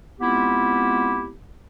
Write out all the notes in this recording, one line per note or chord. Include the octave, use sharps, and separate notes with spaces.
G#3 B3 C4 E4 F4 G4